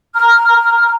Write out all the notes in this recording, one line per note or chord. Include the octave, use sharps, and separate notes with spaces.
A#5 F6